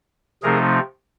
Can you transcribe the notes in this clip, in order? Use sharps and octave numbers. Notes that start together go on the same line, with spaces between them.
C3 F3 A3 C4 D#4 G#4 A#4